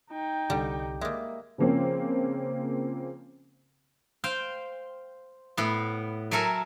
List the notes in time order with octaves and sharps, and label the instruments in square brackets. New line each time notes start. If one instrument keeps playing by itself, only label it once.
[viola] D#4 G5
[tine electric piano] C2 G4 [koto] D3 G3
[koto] G3 G#3 [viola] A#3 [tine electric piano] E5
[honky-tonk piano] C#3 F3 A#3 C4 C#4
[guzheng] C5 F5 G5
A2 B3
F#3 A3 A4 A#4 G#5